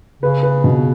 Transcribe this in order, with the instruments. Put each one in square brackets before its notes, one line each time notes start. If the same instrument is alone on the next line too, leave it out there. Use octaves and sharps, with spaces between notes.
[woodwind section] C#3 [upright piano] B4
[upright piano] B4
B2